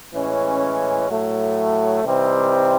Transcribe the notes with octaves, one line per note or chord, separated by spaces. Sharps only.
A2 E3 G#3 C#4
A2 F#3 A3
C3 E3 G3 C4 D#4